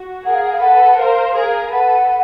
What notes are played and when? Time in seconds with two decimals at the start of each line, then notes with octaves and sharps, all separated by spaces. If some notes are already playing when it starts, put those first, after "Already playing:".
Already playing: F#4
0.25 G#4 A#4 F#5
0.34 F5
0.44 F#5
0.53 F5
0.61 A4 B4 F#5
0.98 A#4 C5 F5
1.35 G#4 A#4
1.72 A4 B4 F#5